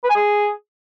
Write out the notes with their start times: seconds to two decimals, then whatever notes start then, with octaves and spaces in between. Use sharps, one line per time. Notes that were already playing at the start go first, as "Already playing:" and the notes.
0.04 B4
0.09 G#5
0.15 G#4